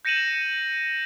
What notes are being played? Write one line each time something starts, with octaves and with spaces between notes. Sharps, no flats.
G6 A#6 C#7 D#7 E7 F#7